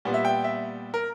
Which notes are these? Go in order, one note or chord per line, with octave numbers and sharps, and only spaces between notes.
A#2 G3 B3
E5
G5
E5
A#4